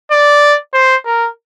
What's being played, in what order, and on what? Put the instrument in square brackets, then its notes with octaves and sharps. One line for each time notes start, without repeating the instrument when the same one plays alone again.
[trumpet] D5
C5
A#4